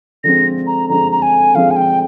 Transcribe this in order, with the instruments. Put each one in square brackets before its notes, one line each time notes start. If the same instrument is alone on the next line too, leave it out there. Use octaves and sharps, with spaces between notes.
[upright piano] D3 F3 G#3 C4 [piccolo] A#6
[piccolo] A#5
[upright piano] D3 F3 G#3 C4 [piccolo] A#5
[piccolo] A#5
G#5
[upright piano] D3 F3 G#3 C4 [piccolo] F5
[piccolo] G#5
G5